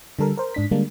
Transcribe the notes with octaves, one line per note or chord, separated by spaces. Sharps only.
D3 G3 A4 A#4
A#4 C5
G#2 D4 B6
D3 G3 G#3 A#3 D4